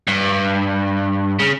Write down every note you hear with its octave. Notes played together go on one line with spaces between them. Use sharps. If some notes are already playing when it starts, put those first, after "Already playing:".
G2
C#3